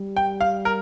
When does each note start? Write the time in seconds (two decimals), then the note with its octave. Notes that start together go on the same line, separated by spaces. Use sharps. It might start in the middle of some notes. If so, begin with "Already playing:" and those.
Already playing: G3
0.17 G5
0.41 F5
0.65 A#4